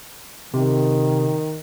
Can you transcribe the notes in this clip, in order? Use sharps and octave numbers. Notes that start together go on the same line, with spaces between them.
C3 D#3